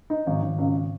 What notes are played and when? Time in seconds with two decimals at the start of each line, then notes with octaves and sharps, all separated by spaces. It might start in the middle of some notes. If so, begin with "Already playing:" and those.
0.10 D#4
0.27 G#1
0.42 G#1
0.58 C#2